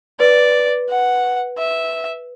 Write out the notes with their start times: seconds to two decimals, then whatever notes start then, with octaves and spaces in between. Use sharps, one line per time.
0.20 B4 D5
0.89 F#5
1.58 E5